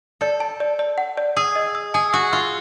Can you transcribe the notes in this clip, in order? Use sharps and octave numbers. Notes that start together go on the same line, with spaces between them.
A4 D5
A5
D5
D5
F#5
D5
G#4 E6
D#5
E6
G#4 G#5
F#4 E6
F4 E6